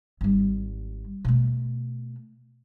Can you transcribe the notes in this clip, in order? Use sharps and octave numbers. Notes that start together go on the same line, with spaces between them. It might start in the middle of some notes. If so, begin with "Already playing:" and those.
G#1 G3
B2 A3